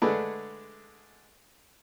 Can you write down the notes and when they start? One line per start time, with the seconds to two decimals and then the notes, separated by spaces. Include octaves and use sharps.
0.02 D3 G#3 A3 D4 G#4 B4